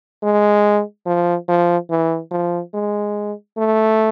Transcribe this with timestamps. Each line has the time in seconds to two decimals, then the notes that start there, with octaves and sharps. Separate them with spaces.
0.23 G#3
1.06 F3
1.48 F3
1.90 E3
2.31 F3
2.74 G#3
3.57 A3